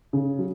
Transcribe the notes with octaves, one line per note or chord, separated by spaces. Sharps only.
C#3
F#3